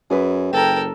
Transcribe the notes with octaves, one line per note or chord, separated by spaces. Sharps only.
F#2 G#4 B4
F#1 A4 A#4 G5